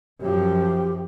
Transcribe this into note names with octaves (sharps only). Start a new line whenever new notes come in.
F#2 F3 G4